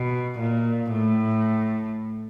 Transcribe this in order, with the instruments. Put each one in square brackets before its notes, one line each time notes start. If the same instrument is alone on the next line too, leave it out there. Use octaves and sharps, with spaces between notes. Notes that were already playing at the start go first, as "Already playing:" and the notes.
Already playing: [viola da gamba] B2
A#2
A2